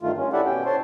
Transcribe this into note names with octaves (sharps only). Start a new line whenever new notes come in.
G2 D#3 A3 F4
C#4
E4 G4 A4 D5 E5 F#5
B2 C#4 G5
C5 C#5 A5 C6